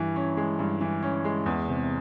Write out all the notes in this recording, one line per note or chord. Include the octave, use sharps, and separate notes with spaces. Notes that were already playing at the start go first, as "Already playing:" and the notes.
Already playing: G2 E3
C#4
G#3
G2
E3
C#4
G#3
E2
C3